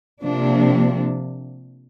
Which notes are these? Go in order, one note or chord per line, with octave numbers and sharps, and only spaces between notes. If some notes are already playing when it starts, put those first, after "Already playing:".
C3 F3 A#3 D4